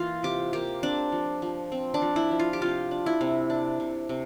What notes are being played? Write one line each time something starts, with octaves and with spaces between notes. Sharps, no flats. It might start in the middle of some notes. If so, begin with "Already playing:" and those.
Already playing: E3 A#3 F4
C3 G4
A#3 G4
C4 D4
F3
F3
C4
D4
F3
E4
F3
F4
G4
C3 F4
D4
E4
C3
D4
C3
C3